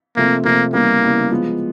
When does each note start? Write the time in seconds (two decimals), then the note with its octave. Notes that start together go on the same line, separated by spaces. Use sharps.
0.16 C3 F3 A3 A#3 C4
0.45 C3 F3 A3 A#3 C4
0.73 C#3 E3 G3 A#3 B3
1.03 C#3 E3 G3 B3
1.30 F3 G#3 B3